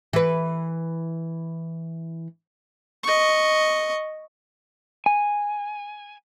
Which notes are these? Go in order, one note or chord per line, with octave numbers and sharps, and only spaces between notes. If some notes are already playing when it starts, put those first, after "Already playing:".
E3 B4
D#5 C#6
G#5